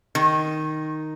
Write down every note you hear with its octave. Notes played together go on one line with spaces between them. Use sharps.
D#3